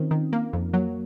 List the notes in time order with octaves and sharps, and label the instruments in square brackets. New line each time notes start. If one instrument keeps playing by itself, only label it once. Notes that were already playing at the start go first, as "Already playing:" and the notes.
Already playing: [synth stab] D#3 [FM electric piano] C4 C#4 D#4 F4
[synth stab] D#3
A#3
F2
[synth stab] F#3 [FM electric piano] A#3